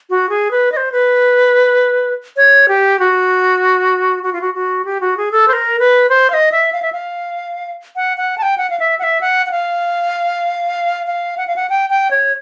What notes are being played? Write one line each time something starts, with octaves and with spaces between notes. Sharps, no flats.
F#4
G#4
B4
D#5
C5
B4
C#5
G4
F#4
F#4
F4
F#4
F#4
G4
F#4
G#4
A4
C5
A#4
B4
C5
F5
D#5
E5
F5
E5
F5
F#5
F#5
A5
G5
F#5
F5
E5
F#5
E5
F#5
F#5
F5
F5
F#5
F5
F#5
G5
G5
C#5